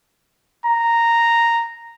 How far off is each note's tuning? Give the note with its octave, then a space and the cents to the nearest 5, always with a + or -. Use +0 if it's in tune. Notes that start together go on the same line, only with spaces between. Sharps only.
A#5 -5